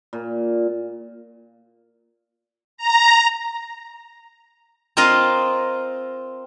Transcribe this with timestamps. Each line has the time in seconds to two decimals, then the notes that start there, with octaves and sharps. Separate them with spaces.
0.13 A#2
2.78 A#5
4.97 C4 F4 A#4 D#5 F5